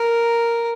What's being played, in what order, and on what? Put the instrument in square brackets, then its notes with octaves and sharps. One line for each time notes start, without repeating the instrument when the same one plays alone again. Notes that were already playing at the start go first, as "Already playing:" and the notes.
Already playing: [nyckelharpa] A#4